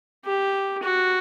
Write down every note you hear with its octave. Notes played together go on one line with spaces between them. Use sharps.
G4
F#4